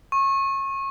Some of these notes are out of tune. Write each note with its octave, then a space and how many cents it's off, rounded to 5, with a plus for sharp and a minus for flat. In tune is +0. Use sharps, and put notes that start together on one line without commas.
C#6 -25